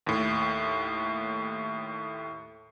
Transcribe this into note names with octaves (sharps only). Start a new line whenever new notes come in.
D#2 A2